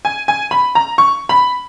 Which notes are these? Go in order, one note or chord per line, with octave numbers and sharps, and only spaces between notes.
G#5
G#5
B5
A#5
C#6
B5